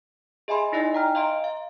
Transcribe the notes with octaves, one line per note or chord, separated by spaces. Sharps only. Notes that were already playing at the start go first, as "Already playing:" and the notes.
G#4 D#5 E5 G#5 B5 C6
D#4 E4 D5 D#5 G#5
G5 A#5 F6
D#5 F5 A#5 C6 D7
F5